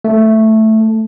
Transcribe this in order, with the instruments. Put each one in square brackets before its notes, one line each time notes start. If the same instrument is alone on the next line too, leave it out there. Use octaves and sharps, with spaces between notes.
[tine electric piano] A3